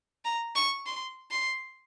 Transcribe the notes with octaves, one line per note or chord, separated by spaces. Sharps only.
A#5
C#6
C6
C6